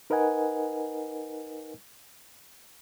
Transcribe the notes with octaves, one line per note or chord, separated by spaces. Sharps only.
D#4 A#4 B4 D#5 F#5 G#5